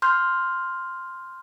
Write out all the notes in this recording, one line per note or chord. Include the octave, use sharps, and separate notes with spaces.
C6 F6 G6